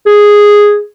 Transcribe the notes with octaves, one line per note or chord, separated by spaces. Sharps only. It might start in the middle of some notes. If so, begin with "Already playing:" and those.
G#4